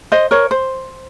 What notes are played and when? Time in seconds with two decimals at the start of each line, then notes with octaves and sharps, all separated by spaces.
0.12 C5 D#5
0.31 A#4 C#5
0.51 C5